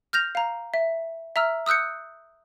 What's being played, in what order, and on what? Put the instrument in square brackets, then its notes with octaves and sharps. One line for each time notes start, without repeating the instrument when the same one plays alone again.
[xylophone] F6 G6 A#6 F7
F5 A#5
E5
E5 A#5 E6 F6
D#6 E6 F#6 G6 C#7